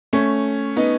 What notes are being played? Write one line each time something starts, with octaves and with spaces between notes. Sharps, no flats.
A3 C#4
B3 D#4